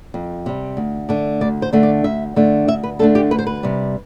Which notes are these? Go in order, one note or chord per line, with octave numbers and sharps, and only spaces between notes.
F2
C3 G3
D2
D3 A3 D4
D2 D5
C5
D3 A3 D4
D5
D2 E5
D3 A3 D4
D2 E5
B4
D3 A3 D4 A4
G4
D2 B4
C5
B4
C3 G3